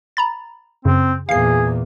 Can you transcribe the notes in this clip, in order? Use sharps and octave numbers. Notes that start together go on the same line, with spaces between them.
A#5 B5 A6
F#2 C#3 C4
E2 A#2 G#4 F5 C7